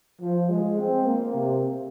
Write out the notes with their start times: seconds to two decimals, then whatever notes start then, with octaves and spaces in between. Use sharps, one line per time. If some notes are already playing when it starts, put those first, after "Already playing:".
0.21 F3
0.49 G#3
0.79 C4
1.06 A#3
1.35 C3